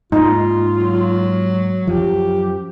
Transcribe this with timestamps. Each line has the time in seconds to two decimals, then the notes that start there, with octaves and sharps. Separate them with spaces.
0.12 G#2 A#3 D#4 F4
0.78 F#3
1.87 F#2 F3 G4